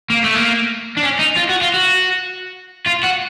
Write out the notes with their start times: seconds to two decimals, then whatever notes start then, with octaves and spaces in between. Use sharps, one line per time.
0.10 A#3
0.24 A3
0.36 A#3
0.97 D4
1.03 C#4
1.19 D#4
1.36 F4
1.49 F#4
1.61 F4
1.74 F#4
2.87 F4
3.04 F#4